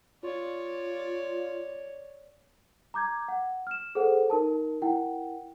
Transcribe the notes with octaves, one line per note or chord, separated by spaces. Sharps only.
F4 C#5 D5
A#5 D6 G6 G#6
F#5
F6 E7
G#4 A4 C5 F#5
D#4 A#4 A5
E4 A#4 F#5 G5